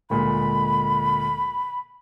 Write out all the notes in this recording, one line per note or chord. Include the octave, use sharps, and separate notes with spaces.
D2 A#2 G#3 B5